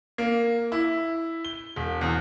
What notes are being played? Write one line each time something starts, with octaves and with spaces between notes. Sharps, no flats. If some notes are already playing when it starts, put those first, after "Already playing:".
A#3
E4
G7
E1
E2